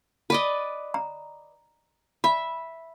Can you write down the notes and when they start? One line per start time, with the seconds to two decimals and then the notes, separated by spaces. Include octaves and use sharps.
0.30 B4 D5 D#5
0.94 A#5
2.24 E5 B5